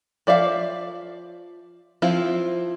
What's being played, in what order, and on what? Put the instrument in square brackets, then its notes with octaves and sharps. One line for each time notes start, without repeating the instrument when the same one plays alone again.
[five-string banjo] F3 D5 E5 F5
F3 C4 E4 F4